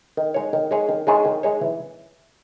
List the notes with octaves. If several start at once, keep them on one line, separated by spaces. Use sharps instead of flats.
D#3
G#3 D#4 G#4 C#5
D#3
G#3 D#4 G#4 C#5
D#3
G#3 D#4 G#4 C#5
D#3
G#3 D#4 G#4 C#5
E3